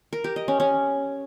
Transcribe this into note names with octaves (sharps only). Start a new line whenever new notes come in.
A#4
G4
D#5
C#4
C#4